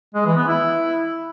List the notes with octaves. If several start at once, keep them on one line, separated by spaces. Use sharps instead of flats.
G#3
E3
B3
E4